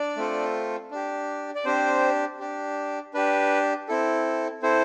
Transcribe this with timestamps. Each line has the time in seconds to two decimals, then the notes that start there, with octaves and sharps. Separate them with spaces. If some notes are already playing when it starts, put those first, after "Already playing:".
Already playing: D4 D5
0.17 A3 C4 F4 A4
0.91 D4 G4
1.55 D5
1.65 C4 D4 G4 C5
2.39 D4 G4
3.14 D4 G4 B4
3.88 C4 E4 A4
4.62 C4 E4 A4 C5